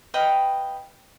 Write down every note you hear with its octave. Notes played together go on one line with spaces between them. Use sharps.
B4 D#5 F5 G5